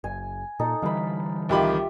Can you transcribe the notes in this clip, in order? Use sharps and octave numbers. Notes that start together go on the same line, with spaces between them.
F#1 G#5
A#2 D#4 A4
D3 E3 G3 F5 B5
C2 D#3 F4 G4 E5 B5